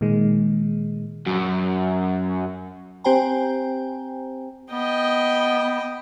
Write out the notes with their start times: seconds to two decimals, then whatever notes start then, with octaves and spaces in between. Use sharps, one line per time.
0.01 A#2 D#3 G#3
1.26 F#2 F#4
3.04 C4 G4 C5 G5 G#5 A#5
4.72 B3 D#5 G5